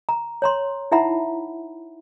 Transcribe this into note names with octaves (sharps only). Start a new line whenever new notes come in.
A#5
C#5 A#5 C6
D#4 E4 E5 F#5 A#5 B5